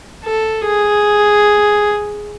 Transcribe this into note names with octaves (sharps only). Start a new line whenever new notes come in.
A4
G#4